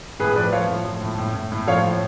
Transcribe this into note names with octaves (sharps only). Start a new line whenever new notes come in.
A2 G#4 B4
F3 B4 D5
F3 C#5 F5
A2
F3
A2
A2
A2
A2
F3 C#5 F5
A2